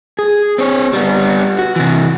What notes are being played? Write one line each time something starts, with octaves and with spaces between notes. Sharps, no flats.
G#4
C4 C#5
G3 B3
F#4
C3 E3